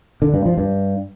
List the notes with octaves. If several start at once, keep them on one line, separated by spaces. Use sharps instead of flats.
D3
G2
F3
G2